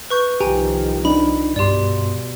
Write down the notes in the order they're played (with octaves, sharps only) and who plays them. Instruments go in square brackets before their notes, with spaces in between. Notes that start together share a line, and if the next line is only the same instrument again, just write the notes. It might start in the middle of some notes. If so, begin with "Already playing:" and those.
[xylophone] B4 C#6 G6
[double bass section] C2 D#3 F3 [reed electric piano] G4 [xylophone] G5 G#5 A#5
[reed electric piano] D4 D#4 [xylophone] B5
[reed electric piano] G2 C6 [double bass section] B2 [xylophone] G4 D5